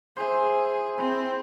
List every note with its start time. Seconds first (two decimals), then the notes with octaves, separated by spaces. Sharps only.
0.17 G#4 C5 E5
0.98 C4 E4